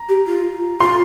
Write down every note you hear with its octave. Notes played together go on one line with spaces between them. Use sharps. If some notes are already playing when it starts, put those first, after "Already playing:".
Already playing: A#5
G4
F4
F4 C6